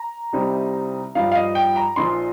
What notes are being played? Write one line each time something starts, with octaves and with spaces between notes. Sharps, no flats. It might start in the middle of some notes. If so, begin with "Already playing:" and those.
Already playing: A#5
C2 C3 G3 C4 D#4
G2 F3 D#4 F5
F5
D#5
G5
A#5
A#1 A#2 F3 D#4 C6